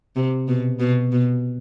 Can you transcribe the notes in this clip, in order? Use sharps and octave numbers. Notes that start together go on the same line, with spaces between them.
C3
B2
B2
B2